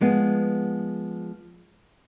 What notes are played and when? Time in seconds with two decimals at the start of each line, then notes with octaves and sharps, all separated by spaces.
0.01 F3 G#3 B3